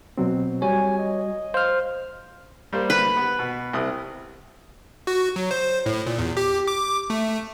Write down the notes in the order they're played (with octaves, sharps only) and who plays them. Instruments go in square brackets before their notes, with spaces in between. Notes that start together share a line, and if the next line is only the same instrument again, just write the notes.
[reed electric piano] B2 F#3 C4
[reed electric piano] G3 F#4 [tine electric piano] C#5 [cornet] G#5
[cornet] D#5
[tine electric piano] C5 F6 [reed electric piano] F5
[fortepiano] G3 A#3 C5
[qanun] B4
[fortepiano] B3
B2
C2 E4 D#6
[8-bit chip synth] F#4
F#3
C5
A2
A#2
E2
G4
D6
A3